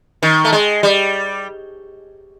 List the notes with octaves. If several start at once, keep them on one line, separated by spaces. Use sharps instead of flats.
D#3
A3
G#3
G3